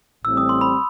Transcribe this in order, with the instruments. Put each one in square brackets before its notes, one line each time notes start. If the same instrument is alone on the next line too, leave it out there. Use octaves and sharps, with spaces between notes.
[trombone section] A1 A2 G3 C4 [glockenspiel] E6
[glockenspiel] D#6
C6
B5